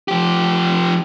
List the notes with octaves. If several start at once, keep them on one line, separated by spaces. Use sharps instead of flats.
F3 G4